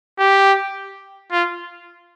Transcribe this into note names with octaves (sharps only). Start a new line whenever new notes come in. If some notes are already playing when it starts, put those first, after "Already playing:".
G4
F4